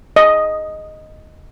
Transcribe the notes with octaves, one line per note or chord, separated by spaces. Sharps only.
D#5